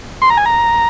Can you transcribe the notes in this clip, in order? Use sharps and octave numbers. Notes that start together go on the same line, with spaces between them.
C6
A#5
G#5
A#5